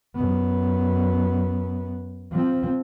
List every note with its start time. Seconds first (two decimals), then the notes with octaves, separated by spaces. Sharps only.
0.15 F#2 B3
2.32 F3 C4